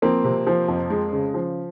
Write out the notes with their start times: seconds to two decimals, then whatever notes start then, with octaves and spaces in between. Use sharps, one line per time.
0.02 F3 A#3 C4
0.24 C3
0.47 F3
0.68 F2
0.90 G#3
1.12 C#3
1.34 F3